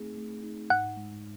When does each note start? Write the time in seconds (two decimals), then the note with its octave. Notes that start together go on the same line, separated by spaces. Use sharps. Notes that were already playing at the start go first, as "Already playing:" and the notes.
Already playing: A3 C4 D#4 G#4
0.17 A3
0.43 D#4
0.70 G#2 F#5
0.97 G#3